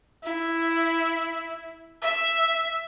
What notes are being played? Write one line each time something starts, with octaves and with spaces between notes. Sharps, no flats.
E4
E5